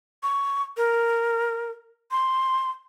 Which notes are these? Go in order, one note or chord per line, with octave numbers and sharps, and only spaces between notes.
C#6
A#4
C6